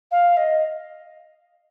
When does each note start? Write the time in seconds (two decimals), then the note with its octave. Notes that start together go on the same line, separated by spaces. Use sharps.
0.11 F5
0.37 D#5